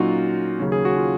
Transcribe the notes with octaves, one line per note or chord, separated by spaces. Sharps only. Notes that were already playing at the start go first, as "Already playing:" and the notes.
Already playing: A#2 F#3 C#4 D#4 F4 F#4
D#2 C#3 F#3 C#4
G#4
F#4
F4